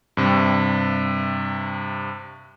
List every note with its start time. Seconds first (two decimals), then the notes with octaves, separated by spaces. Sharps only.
0.17 G2 C3